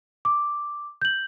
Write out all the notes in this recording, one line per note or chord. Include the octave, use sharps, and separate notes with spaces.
D6
G6 F#7